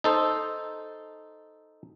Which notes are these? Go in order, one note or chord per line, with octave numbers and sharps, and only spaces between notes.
D#4 A4 C5